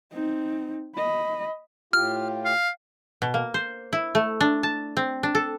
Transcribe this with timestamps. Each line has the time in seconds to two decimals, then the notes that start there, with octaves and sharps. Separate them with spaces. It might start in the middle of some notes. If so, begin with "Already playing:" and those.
0.12 C4 D#4
0.96 D#5 B5
1.93 A2 F4 G4 F6
2.45 F5
3.22 B2
3.34 A#3
3.54 C5
3.93 E4
4.15 A3
4.41 D4
4.63 A5
4.97 C4
5.23 D4
5.35 A4